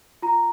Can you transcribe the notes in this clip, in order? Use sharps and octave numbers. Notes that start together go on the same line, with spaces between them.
F4 A#5